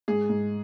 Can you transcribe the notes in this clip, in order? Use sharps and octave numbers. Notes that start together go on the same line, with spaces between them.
G#2 G#4
G#2